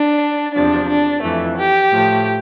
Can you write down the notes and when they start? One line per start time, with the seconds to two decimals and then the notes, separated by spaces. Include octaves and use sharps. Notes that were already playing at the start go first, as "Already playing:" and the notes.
Already playing: D4
0.55 E2 C3 F3 D4
0.88 D4
1.23 F2 E3 A3
1.57 G4
1.91 A2 F3 A3